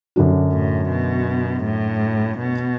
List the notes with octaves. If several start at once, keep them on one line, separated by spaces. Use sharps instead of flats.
F#2 D3 F#3 D4 F#4
A2
B2
A2
B2